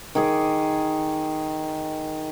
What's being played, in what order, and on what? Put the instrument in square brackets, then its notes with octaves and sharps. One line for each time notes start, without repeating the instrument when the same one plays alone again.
[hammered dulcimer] D#3 G#4 D6